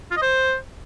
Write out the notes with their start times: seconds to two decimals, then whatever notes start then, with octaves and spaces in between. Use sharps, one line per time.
0.11 F4
0.17 D#5
0.22 C5